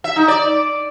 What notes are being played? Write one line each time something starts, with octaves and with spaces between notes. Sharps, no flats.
E5
D#4
D5